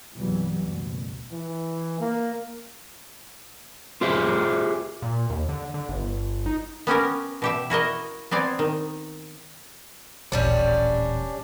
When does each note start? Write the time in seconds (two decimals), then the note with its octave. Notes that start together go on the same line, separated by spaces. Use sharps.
0.15 C2 G2 B2 E3 F#3 G3
0.60 F#1 D2 B2
1.32 E3
2.00 A#3
4.01 F4 G4 G#4 C5 E5
5.02 A#2
5.30 D#2
5.49 D3
5.74 D3
5.89 G1
6.46 D#4
6.87 B3 C#4 G4 A#4
7.42 B2 G4 E5
7.70 E4 F#4 A#4 D#5
8.31 B3 C4 D5 G#5
8.59 D#3
10.32 D#1 A1 G3 C#4 D4